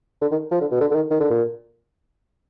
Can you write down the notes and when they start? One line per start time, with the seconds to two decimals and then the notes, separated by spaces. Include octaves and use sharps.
0.21 D3
0.31 D#3
0.51 F3
0.60 D3
0.71 B2
0.80 D3
0.90 D3
0.95 D#3
1.10 D#3
1.20 D3
1.30 A#2